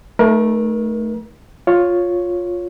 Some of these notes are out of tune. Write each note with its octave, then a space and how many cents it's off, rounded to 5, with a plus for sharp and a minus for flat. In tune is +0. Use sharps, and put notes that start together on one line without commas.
A3 -5 D#4 +0 A#4 +35
F4 +10 C#5 +0